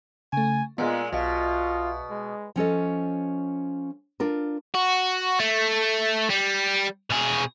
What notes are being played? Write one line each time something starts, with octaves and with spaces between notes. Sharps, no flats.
C#3 A3 G#5
A#2 G#3 B3 F4 F#5
B1 B2 F4 E5 F5
G#3
F3 C#4 A4 D#5
D4 F4 A#4
F#4
A3
G3
B2 G#4